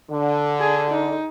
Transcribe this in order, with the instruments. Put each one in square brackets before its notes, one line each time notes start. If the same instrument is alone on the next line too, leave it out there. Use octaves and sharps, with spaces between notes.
[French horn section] D3
[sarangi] G#4
D#4